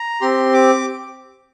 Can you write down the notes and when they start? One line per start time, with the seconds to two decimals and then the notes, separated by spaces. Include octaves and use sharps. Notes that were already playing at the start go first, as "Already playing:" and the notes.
Already playing: A#5
0.21 C4 G4 C6
0.53 D6